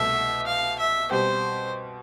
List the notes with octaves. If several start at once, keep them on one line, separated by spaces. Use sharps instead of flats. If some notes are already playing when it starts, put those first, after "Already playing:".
Already playing: C2 B2 A3 E5
F5
E5
B2 G3 C4 G4 C5